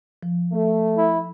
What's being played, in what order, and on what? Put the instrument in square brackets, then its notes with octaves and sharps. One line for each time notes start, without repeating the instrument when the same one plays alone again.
[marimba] F3
[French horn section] A3
[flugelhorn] E4